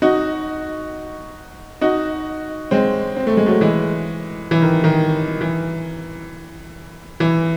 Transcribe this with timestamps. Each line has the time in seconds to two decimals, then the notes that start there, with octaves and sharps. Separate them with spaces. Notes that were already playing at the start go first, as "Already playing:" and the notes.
0.02 D#4 F#4
1.81 D#4 F#4
2.71 G#3 C4
3.16 C4
3.27 A3
3.37 G#3
3.46 F#3 A3
3.61 E3 G#3
4.51 E3
4.62 D#3
4.84 D#3
5.41 E3
7.20 E3